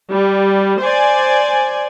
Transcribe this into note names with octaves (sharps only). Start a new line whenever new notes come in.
G3
C5 D5 G#5